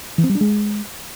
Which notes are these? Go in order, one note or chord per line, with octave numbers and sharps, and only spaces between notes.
E3
C4
G3
D4
G#3